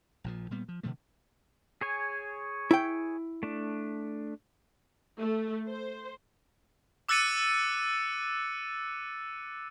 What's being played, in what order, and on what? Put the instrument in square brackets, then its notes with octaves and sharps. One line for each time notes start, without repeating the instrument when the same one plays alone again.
[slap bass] A#1 A#2 F3
A#2 G3 B3
F3
B2 D3 F3 A3
[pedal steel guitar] G#4 C#5 G#5
[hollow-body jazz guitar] E4 G5
[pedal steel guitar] A3 D4
[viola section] A3
C5
[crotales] D6 E6 F#6 A6 C#7 D#7